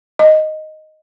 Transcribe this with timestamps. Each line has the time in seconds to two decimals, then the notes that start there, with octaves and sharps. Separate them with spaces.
0.19 D#5